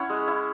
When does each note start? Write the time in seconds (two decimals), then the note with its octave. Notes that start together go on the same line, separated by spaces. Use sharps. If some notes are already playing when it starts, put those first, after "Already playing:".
Already playing: C#4 E4 C#5 F#5
0.10 G#3
0.28 E4